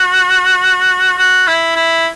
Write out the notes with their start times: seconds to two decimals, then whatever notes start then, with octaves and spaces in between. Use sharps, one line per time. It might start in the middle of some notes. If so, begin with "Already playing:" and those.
Already playing: F#4
1.18 F#4
1.47 E4
1.76 E4